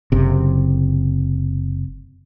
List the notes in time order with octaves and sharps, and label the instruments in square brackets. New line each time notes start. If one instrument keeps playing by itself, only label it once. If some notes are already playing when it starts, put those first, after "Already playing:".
[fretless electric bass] F#1 C3